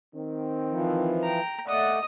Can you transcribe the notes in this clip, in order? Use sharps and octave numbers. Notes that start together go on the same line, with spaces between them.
D#3 C4
E3 F3
G5 A#5
A3 D5 D#5 F#5 D#6